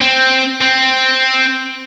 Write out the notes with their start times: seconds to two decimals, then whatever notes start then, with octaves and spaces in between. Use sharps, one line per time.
0.01 C4
0.61 C4